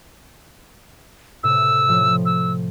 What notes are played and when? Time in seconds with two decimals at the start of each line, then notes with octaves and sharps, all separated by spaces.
1.43 A2 C3 E6
1.88 A2 F3
2.26 E6